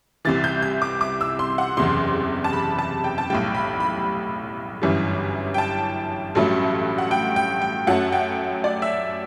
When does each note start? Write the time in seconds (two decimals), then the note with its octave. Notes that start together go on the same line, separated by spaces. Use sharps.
0.25 C2 C3 E3 A6
0.44 G6
0.62 G6
0.82 D6
1.01 D6
1.21 E6
1.39 C6
1.58 F#5
1.77 F#1 E2 C3 C6
2.44 A5
2.53 B5
2.79 A5
3.04 G5
3.18 A5
3.30 B1 A2 G3 G5
3.55 B5
3.80 B5
4.82 G1 F#2 E3 G3
5.54 G5
5.58 A5
6.35 A1 G2 F#3 A3
6.98 F#5
7.11 G5
7.36 G5
7.62 G5
7.87 F#2 F#3 A3 F#5
8.12 G5
8.64 D5
8.82 E5